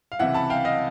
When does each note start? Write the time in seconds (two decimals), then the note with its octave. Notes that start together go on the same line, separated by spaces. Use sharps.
0.12 F5
0.19 C#2 C3 E3 E5 F#5
0.34 A5 B5
0.50 F5 G5
0.65 D#5 F5